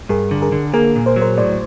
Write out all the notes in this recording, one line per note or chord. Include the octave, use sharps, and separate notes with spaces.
G2 G#4 A#4
D3
G#4 A#4
D3
A#3 G#4 A#4
A#2
A#4 C5
F#3
A#4 C5
A2 C5 D5